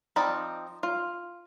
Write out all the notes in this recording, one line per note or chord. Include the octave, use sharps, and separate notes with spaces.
F3 C4 D#4 D5 B5
F4